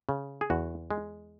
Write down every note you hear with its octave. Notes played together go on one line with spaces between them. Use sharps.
C#3
G#4
E2 F#4
G#3